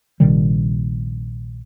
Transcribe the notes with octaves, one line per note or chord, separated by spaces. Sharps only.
A#1 C3 D#3 G3